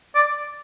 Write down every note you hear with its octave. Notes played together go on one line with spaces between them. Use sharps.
D5